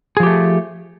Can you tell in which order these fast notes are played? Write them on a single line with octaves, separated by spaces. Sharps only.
G#4 F3 G4 A3